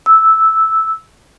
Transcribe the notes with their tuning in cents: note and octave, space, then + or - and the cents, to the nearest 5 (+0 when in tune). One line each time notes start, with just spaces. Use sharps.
E6 -5